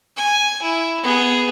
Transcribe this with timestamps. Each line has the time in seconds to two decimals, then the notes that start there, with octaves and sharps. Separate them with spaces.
0.17 G#5
0.62 E4
1.03 B3 G#4